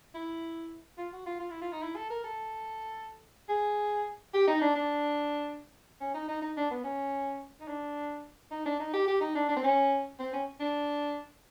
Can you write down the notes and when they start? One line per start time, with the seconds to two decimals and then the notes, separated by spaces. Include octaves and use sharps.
0.15 E4
0.98 F4
1.13 F#4
1.26 F4
1.40 F4
1.50 E4
1.62 F4
1.72 D#4
1.83 E4
1.96 A4
2.10 A#4
2.24 A4
3.49 G#4
4.34 G4
4.48 D#4
4.61 D4
4.75 D4
6.01 C#4
6.14 D#4
6.28 D#4
6.42 D#4
6.57 D4
6.71 B3
6.84 C#4
7.61 D#4
7.68 D4
8.51 D#4
8.66 D4
8.80 D#4
8.94 G4
9.08 G4
9.21 D#4
9.35 D4
9.49 D4
9.56 C4
9.64 C#4
10.19 C4
10.33 C#4
10.60 D4